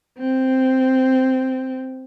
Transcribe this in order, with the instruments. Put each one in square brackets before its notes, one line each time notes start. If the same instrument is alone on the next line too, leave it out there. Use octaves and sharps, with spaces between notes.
[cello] C4